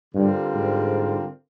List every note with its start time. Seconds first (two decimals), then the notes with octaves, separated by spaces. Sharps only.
0.14 G2 D3 G3 C4 F4 A#4
0.54 G#2